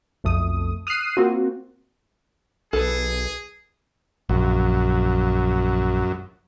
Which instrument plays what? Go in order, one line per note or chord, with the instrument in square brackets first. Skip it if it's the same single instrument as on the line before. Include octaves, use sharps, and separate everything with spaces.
[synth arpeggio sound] B1 F2 A3 D#6
D#6 F6 F#6 C7 D#7
A#3 C4 F4 F#4
[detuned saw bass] B1 [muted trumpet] G#4 [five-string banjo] A4 B4
[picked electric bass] A#1 [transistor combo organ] F#2